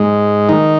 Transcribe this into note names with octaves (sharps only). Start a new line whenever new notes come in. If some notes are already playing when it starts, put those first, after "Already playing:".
Already playing: G#2 G#3
D#3 D#4